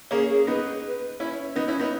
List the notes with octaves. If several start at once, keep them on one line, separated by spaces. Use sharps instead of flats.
A#3 C#4 G#4
G#4
B3 D#4 B4
C#4 E4
B3 D#4
C#4 E4
B3 D#4